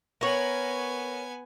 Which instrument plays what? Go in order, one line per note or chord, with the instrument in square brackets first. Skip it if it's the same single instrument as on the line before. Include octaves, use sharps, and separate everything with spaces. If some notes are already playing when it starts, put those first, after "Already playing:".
[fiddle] B3 G#5 [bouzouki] A#4 C#5